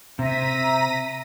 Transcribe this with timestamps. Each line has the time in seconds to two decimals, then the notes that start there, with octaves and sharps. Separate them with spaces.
0.19 C3 C5 E5 A#5 A#6 B6 D#7